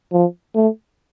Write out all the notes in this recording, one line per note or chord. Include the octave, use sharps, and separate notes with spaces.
F3
A3